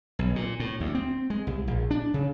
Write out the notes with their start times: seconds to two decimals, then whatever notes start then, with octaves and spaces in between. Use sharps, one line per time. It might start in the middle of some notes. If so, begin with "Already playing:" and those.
0.19 B1
0.36 A#2
0.60 A2
0.80 D2
0.95 C4
1.30 G#3
1.47 C2
1.67 A#1
1.91 D4
2.14 C#3